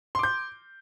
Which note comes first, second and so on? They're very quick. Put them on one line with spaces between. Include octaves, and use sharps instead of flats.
C6 D6 G6